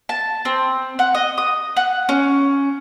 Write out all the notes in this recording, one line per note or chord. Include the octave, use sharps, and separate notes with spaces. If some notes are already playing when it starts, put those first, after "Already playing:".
A5
C4
F#5
D#5
D#6
F#5
C#4